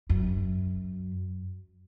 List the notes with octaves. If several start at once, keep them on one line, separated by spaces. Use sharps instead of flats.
F#2